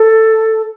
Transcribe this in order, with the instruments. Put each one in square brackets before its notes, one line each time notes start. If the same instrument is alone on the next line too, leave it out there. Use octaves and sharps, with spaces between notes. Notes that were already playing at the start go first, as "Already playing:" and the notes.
Already playing: [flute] A4